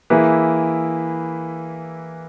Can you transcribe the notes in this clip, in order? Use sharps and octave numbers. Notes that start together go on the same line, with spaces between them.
E3 A#3 E4 G#4 B4